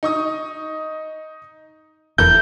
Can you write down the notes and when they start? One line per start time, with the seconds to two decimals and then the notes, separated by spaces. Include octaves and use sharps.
0.03 D#4 C#6 D#6
2.18 F1 E2 E4 A4 A#4 G6